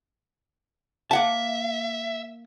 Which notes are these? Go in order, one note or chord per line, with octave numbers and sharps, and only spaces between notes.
A#3 E5 F#5 A5